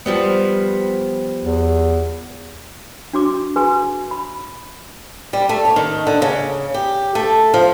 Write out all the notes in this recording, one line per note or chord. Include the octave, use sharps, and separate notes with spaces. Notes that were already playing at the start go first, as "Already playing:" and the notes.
F3 G3 B3
E2
D4 F#4 D6
F#4 G#4 B4 G#5
B5
G3
A3
C#5
D#3
D3
C#3
G4
A3
F3